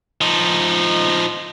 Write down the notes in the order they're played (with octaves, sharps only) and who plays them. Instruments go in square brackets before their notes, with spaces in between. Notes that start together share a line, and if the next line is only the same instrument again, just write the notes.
[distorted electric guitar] F3 D#4